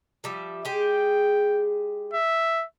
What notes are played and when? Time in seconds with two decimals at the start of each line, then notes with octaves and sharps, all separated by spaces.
0.24 F3 G3 E5
0.65 G#3 G4 G#4 G5
2.14 E5